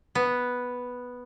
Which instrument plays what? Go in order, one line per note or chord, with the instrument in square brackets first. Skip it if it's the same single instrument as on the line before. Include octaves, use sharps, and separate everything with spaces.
[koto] B3